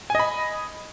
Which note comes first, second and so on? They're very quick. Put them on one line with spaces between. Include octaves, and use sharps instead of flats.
G#5 D#5 B5